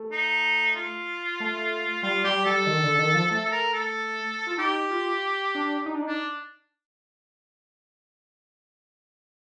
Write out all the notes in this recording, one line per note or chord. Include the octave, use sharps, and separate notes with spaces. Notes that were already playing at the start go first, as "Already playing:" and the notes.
Already playing: A3
D#4
F4
A3
G3 F4
G3 G4
G3 A4
D#3
D3
D#3
F3
A3 A4
A4
A#4
A4
F4
D#4 G4
F4
D4
D#4
D4
D#4
D4